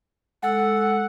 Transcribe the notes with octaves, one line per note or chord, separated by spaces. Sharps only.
G#3 A4 F#5 E6